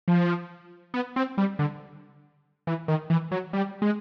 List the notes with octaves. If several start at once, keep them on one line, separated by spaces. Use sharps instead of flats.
F3
B3
C4
G3
D3
E3
D#3
E3
F#3
G3
G#3